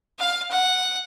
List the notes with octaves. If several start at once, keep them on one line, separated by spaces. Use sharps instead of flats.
F5
F#5